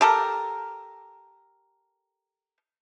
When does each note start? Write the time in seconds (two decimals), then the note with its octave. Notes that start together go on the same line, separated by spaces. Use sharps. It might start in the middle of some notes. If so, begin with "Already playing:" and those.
0.01 G4 A4 A#4